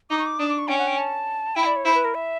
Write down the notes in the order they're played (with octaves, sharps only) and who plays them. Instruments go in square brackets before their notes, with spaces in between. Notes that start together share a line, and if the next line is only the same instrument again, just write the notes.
[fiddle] D#4 [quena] D6
[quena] C#6
D6
[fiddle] D4 [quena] D#6
[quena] D6
C#6
[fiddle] C#4 [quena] G5
[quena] F#5
G5
A5
[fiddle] E4 [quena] G5
[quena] D5
C#5
[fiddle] E4 [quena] C5
[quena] B4
A#4
E5